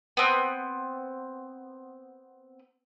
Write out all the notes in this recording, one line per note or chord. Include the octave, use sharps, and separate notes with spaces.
B3 C4